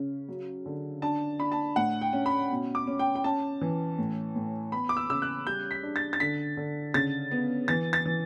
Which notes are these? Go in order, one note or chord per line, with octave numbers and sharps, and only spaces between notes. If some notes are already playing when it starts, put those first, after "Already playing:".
Already playing: C#3 C#4
F#3
D3
D4 A5
D4 B5
A5
A2 F#5
G5
C#4
B5
B2
D6
C#4
G5
G5
C#4 A5
E3
A2
A2
B3 B5
D6
E6
C#3 E6
F#6
G3 G6
B6
D4
A6
A6
D3 B6
D3
C#3 A6
B3
E3 A6
A6
E3